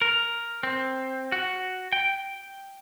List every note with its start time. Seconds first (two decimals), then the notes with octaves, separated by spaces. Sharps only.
0.02 A#4
0.63 C4
1.32 F#4
1.93 G5